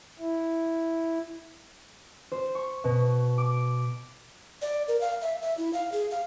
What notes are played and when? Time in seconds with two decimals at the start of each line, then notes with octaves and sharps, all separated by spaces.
0.20 E4
2.32 C5
2.55 C#6
2.84 B2
3.38 D6
4.62 D5
4.88 A#4
5.01 F5
5.21 E5
5.42 E5
5.58 E4
5.73 F5
5.92 G#4
6.11 F5